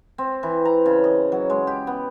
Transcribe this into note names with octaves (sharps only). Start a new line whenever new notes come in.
C4
E3
A#5
C#3
D#5
F#3
G#3
G4
B3